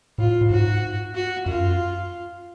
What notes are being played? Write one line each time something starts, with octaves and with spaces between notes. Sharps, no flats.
A2 F4
A2
G#2 F#4
F#4
F#2 F4